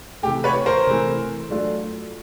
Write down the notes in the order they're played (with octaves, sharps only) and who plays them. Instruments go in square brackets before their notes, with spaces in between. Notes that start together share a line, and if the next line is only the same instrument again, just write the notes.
[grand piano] C3 E3 A3 [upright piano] G4
[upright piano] B4 C#5
A#4 C5
[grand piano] C3 E3 A3
F#3 A3 D4 F4